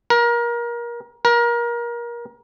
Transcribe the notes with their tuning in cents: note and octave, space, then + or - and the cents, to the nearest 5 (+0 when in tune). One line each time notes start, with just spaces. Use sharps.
A#4 +25
A#4 +25